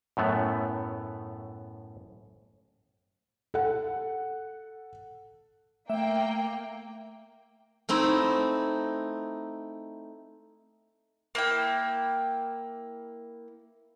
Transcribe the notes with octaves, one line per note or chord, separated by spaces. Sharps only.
F#2 A2 A3 B3
A4 F#5
A3 A#3 E5 G5
A3 C4 D#4 E4
A#3 E4 G5